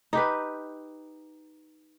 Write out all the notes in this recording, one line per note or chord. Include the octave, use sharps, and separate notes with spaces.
D#4 G4 B4